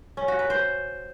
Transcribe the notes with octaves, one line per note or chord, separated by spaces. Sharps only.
C#4
F#4
B4
C5